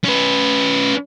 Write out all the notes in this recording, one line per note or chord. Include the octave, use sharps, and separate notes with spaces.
C#4 B4